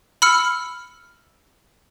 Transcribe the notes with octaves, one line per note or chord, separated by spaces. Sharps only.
B5 E6 F6 C#7